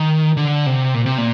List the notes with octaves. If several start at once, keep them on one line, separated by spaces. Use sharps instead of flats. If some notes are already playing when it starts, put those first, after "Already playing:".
Already playing: D#3
D3
C3
A#2
C3
A#2